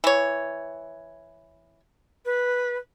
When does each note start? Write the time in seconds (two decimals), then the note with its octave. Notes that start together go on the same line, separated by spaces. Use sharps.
0.04 E3 C#5
2.25 B4